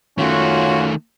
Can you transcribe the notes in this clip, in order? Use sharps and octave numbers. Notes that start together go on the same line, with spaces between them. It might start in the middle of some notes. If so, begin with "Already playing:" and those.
D#3 A3 C#4 F4 F#4